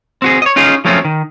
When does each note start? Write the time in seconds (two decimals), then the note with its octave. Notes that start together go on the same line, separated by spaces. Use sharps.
0.22 C4 F#4 G#4
0.42 C#5 D#5
0.56 C#4 D#4 F4 G#4
0.85 F3 F#3 A3 C4 C#4 F4
1.05 D#3